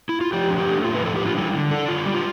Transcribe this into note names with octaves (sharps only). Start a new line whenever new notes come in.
E4
F4
F3 G4
D4
G4
A3
A2 F4
B4
F3 A4
D4 G4
F4
G3 E4
D3
D4 A4
D3 F4
G3 G4
F4